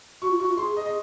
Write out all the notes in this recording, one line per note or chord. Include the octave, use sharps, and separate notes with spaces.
F#4 C#6
F4
F#4 C#6
F4
G#4 C6
G#4 D#5
D#5